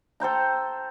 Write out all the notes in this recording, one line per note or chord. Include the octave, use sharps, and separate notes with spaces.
A4 C5 G5 A#5